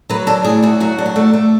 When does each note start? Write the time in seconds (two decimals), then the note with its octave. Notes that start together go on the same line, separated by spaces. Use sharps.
0.09 F#3 B4
0.27 D4 A4
0.44 A2 G#4
0.63 A3 F#4
0.80 F#3 F#4
0.98 D4
1.06 F#4
1.16 A3
1.33 A3